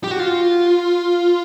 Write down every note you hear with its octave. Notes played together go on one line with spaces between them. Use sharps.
G4
F#4
F4